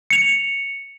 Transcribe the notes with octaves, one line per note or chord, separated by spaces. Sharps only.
C#7 F7